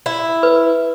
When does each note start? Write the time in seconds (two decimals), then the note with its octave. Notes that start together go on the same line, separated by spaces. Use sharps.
0.06 E4
0.43 B4